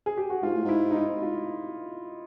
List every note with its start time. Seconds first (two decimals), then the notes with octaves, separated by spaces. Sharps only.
0.06 G#4
0.17 G4
0.30 F#4
0.43 G#2 F4
0.54 A2
0.64 G#2 E4
0.91 D#4
0.96 E4
1.22 F4